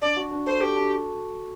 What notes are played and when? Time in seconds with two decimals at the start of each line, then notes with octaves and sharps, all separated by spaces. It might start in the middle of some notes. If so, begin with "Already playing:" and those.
0.02 D4 D5
0.16 F#4
0.31 D4
0.46 A4 C5
0.61 G4 A4
0.76 D4